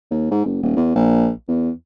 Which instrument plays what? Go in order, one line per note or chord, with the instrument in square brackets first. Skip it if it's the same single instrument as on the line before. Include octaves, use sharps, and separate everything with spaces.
[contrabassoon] D#2
G#2
F#1
D#1
E2
A#1
E2